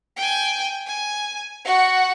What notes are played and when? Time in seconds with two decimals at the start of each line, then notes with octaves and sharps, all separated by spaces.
0.17 G5 G#5
0.86 G#5
1.64 F#4 F#5